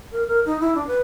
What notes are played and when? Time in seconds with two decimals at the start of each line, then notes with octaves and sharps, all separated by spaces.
0.12 A#4
0.27 A#4
0.46 D#4
0.60 E4
0.75 D4
0.87 B4